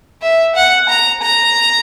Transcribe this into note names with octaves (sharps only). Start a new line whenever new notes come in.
E5
F#5
A#5
A#5